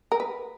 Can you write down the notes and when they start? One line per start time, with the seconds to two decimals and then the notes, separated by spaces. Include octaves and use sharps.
0.12 A#4
0.20 B4